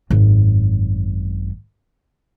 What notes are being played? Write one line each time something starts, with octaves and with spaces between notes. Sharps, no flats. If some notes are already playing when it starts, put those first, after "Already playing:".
G#1 F#2